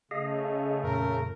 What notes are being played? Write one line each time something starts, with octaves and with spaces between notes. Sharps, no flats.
C#3 A3 G#4 D#5 F5
F2 A#2 A#4